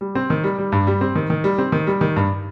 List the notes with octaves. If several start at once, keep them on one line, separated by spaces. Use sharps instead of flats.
G3
C4
D#3
G3
G3
G2
G3
C4
D#3
D#3
G3
C4
D#3
G3
D#3
G2